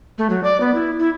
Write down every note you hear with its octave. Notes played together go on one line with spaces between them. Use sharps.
A3
F#3
D5
B3
E4
E4